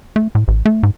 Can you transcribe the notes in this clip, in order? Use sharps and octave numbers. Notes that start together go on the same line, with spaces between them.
A3
A2
A1
A3
G#2